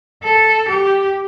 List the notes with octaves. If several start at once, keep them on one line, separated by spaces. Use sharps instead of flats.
A4
G4